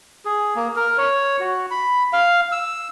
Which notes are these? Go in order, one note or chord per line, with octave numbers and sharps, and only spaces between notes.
G#4
A#3
A#4
C#5
F#4
B5
F5
E6